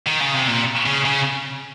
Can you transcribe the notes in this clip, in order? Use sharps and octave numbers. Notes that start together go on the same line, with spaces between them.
D#3
C#3
C3
A#2
C#3
C#3